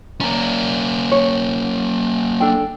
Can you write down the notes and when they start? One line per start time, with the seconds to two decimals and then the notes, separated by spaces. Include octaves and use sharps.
0.20 A#3 C#4 D5 A#5
1.12 C#5
2.40 D4 A4 G5